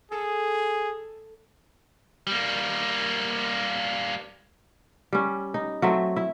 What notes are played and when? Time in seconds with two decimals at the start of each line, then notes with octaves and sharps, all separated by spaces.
0.12 G#4 A4
2.27 G3 A#3
5.13 G3 C#4
5.54 D#4
5.82 F#3 A3 C4 E5
6.16 E4 E5